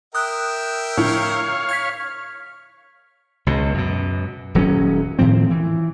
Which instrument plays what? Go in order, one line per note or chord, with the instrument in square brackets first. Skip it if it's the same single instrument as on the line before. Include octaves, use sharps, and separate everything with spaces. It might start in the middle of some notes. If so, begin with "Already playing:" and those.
[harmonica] A#4 E5 G5 [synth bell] D#6 F#6
[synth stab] A2 D3 F3 [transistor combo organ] C#5 F5
[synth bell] F6 G#6 B6
[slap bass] C#2 B2
F#2 B2
D#1 F#3 C4 C#4
A2 D#3 F3 C4
E3